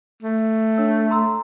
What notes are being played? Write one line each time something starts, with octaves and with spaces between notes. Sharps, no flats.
A3
D4 C#5 E6
A#5 C6 E6